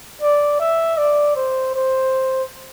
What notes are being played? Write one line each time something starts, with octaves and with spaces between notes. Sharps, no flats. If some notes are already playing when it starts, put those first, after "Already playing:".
D5
E5
D5
C5
C5